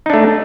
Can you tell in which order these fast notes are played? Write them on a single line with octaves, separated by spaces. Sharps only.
D#4 D4 A3